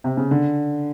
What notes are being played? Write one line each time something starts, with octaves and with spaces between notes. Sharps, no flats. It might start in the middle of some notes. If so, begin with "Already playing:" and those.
C3
C#3
D3